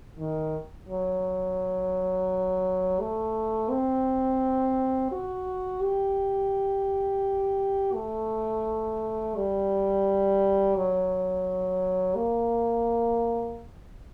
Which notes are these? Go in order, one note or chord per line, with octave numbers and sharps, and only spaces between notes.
D#3
F#3
A3
C4
F#4
G4
A3
G3
F#3
A#3